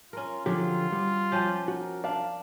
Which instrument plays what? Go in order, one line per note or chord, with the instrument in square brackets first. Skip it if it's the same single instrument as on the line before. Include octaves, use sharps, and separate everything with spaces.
[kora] C#4 A#4 [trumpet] F4
[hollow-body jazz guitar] D3 F3 G4 [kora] F#3 [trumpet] F4
[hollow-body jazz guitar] G3
[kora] F3 C#4 G4
[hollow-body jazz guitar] F#4 [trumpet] A#4
[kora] D4 [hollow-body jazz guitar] D5 F5